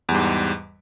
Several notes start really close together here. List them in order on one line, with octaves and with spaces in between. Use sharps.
E2 G3 G#2